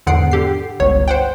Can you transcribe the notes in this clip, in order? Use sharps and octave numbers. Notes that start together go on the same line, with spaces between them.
E2 G#2 D3 F#5 C7 D7
D3 G4 C7
G1 C#2 C#5
C5 F#5 G5